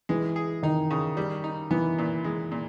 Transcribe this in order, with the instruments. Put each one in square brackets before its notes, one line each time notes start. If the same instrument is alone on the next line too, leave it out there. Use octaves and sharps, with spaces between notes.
[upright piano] E3 [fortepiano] G#3
[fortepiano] G#4
[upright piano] D#3 [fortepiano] D#4
[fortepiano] C#3
G3
D#4
[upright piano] E3 [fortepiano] B3
[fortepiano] A#2
G#3
A#2